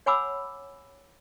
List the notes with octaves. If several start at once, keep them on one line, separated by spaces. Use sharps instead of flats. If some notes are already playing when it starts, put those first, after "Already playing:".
C#5 F#5 G#5 B5 D6 E6